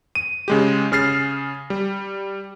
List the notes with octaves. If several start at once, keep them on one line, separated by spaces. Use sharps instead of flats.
D#7
C#3 G#3 G4
C#3 G#4 F6 A6 C7
G3